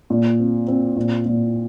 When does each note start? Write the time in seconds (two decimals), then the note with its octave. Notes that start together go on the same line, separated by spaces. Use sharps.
0.10 A#2
0.39 C4
0.68 C4
0.97 A#2
1.26 A#2